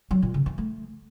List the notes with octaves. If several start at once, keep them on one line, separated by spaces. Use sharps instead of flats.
F#3
A#2
C#3
E3
A3